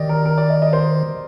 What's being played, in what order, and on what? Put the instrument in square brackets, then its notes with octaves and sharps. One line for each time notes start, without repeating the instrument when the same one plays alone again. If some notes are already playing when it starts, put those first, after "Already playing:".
Already playing: [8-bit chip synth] D#3 [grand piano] G4 D5 D#5
[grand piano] A#4
A#4
D5
D#5
D#5
C5